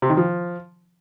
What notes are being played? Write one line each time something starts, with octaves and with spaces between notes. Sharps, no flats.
C3
D#3
F3